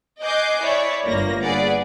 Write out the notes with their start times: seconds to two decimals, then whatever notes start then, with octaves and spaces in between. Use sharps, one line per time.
0.22 D#5 G#5 D6 F#6 G6 C7
0.62 E4 C#5 D5
1.05 G1 A#3 A#6
1.43 G#4 B4 D5 F#5